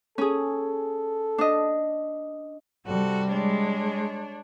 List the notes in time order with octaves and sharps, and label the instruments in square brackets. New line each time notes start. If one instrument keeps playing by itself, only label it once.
[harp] C#4 G#4 [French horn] A4
[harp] D4 D#5
[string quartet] C3 F#4 A4 [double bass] G3
[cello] G#3 [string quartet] D4 C#5